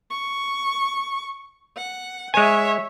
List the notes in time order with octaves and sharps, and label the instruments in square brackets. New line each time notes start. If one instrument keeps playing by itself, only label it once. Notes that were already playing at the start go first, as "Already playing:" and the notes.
[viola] C#6
F#5
[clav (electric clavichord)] G#3 G#5 [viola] C#5 E5